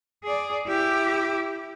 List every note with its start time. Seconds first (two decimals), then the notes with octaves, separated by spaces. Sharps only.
0.24 G#4 D5
0.67 E4 G4